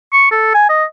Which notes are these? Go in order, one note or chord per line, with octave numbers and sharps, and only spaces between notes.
C#6
A4
G#5
D#5